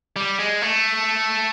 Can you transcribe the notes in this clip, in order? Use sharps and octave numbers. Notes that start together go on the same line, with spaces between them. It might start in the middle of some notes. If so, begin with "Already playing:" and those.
G3
G#3
A3